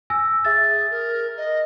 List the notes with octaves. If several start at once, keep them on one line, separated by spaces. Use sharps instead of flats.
G#5 E6 A#6
G#4 E5 A6
A#4
D#5